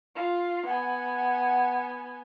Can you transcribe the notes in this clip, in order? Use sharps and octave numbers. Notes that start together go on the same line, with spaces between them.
F4
B3 F#5 G#5